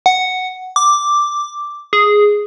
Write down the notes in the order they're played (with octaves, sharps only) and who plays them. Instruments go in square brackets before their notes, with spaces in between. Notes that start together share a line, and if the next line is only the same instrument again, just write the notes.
[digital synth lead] F#5
D6
G#4